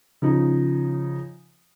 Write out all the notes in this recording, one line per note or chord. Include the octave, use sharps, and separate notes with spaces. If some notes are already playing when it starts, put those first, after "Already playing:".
C#3 F3 D#4